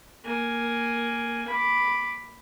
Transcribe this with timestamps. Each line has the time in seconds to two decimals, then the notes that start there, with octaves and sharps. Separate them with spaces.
0.25 A#3 G#5
1.48 B5 D6